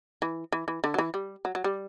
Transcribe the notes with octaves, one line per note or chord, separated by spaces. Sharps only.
E3
E3
E3
D3
F#3
E3
G3
F#3
F#3
G3